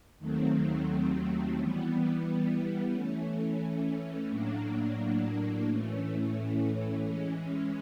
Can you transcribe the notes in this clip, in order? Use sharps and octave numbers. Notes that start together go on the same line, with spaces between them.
D#2 D#3 F#3 A3 C4
E3 G3 B3
E3 A3 C#4
A2 F#3 A#3 D4
A2 E3 A3 C#4
E3 G#3 C#4